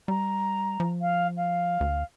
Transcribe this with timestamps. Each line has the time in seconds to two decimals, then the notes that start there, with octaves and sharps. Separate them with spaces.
0.08 G3 A#5
0.80 F3
1.01 F5
1.37 F5
1.80 D2